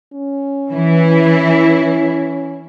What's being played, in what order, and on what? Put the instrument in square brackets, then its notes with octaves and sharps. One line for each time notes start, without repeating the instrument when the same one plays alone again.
[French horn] C#4
[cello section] E3 E4